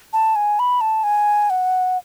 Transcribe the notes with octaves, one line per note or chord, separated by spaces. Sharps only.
A5
G#5
B5
A5
G#5
F#5